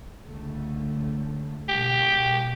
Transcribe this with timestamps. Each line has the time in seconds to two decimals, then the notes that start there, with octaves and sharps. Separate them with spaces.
0.27 C#2 D3 A3
1.69 B2 G#3 G4